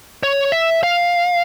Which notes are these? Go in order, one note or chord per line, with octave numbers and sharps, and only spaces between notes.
C#5
E5
F5